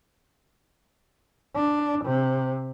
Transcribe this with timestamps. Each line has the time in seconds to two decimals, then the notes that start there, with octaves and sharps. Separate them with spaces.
1.55 D4
2.05 C3